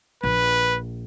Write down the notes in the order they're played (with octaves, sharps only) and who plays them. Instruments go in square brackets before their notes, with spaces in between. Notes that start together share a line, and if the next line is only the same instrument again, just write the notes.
[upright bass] A#1 [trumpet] B4